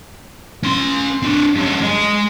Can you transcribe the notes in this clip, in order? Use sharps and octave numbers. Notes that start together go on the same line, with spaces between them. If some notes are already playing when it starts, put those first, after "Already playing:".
C#4 C6
C4 D4
G2 C#4
G#3 D#5